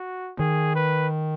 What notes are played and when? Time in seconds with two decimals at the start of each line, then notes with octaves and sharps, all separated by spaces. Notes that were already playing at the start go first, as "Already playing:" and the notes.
Already playing: F#4
0.39 D#3 G#4
0.75 B4